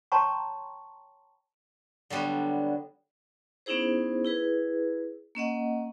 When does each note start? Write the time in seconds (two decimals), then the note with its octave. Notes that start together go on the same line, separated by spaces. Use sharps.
0.12 C#5 G5 A5 A#5 C6 C#6
2.10 D3 F#3 G3 B3
3.66 B3 C#4 D#4 E4 G#4 C5
4.24 E4 G#4 B4
5.35 A#3 C#4 D#5 F#5